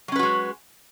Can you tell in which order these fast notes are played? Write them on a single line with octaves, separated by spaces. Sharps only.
F#3 C#4 B4 F#4 G#3